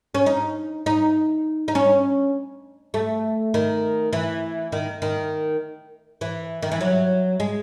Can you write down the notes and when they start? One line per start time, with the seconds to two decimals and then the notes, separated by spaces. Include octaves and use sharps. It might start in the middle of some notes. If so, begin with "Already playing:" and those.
0.14 C#4
0.26 D#4
0.86 D#4
1.68 D#4
1.75 C#4
2.94 A3
3.54 D#3
4.13 E3
4.72 D#3
5.02 D#3
6.21 E3
6.62 D#3
6.72 E3
6.81 F#3
7.40 G#3